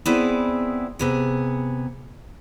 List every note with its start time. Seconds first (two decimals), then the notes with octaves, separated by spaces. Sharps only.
0.06 B3 C4 E4 G#4 D5
0.99 C3 B3 G#4